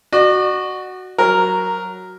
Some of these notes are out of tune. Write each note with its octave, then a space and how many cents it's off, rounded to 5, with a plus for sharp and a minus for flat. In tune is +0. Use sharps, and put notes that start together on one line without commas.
F#4 +0 D5 +45
F#3 +0 A#4 +0